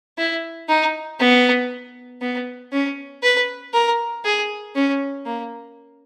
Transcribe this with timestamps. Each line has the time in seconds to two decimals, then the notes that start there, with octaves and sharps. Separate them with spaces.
0.18 E4
0.68 D#4
1.20 B3
2.21 B3
2.72 C#4
3.23 B4
3.74 A#4
4.25 G#4
4.75 C#4
5.26 A#3